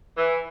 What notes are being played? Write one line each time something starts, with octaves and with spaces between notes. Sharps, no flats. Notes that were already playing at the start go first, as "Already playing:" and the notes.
E3